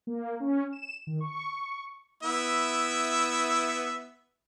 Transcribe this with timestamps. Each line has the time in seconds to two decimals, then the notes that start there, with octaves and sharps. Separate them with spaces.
0.07 A#3
0.40 C#4
0.73 E7
1.07 D#3
1.20 C#6
2.23 B3 E4 E5